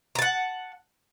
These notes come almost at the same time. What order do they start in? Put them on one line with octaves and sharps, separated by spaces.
A#5 A5 F#5